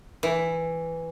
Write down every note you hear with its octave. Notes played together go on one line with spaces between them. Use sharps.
E3